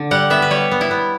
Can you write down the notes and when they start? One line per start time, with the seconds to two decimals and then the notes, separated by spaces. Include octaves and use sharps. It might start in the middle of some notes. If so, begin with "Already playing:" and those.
Already playing: D3
0.11 G3 F#5
0.30 B3 E5
0.42 B4
0.50 G3 C#5
0.71 B3
0.81 E4
0.91 B3